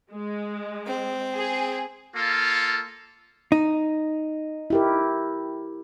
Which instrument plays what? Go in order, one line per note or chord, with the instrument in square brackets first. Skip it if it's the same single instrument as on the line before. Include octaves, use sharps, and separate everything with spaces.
[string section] G#3
[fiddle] C4
[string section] G#4
[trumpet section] A#3 F4 A4
[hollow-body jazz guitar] D#4
[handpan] E4 G4 A#4